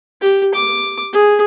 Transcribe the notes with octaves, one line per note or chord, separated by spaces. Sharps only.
G4
D6
G#4